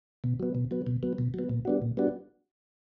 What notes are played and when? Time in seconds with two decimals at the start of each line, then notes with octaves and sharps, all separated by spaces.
0.24 B2
0.40 F#3 B3
0.55 B2
0.71 F#3 B3
0.87 B2
1.03 F#3 B3
1.18 B2
1.34 F#3 B3
1.49 A#2
1.65 G3 B3 D4 F#4
1.82 A#2
1.97 G3 B3 D4 F#4